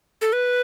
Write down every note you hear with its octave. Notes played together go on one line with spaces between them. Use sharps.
A4
B4